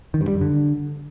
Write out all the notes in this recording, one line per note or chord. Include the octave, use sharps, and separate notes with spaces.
D#3
G2
G3
F#2
D3